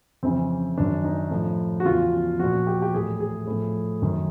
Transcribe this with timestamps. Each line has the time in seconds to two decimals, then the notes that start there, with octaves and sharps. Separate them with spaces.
0.23 F2 C#3 E3 C4
0.77 F#2 D#3 D4
1.04 D#4
1.31 A2 F3
1.80 F#4
1.85 E2 C#3 F3 F4
2.39 A#2 F3 F#4
2.67 G4
2.82 G4
2.94 A2 E3 G#4
3.20 G#4
3.47 A2 F3
4.02 F#2 D#3